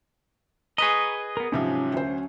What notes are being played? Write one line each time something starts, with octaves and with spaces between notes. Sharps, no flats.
G#4 B4 D#5 A#5 C#6
B3 A#4
G#2 C3 F3 F#3 C#4
D2 C5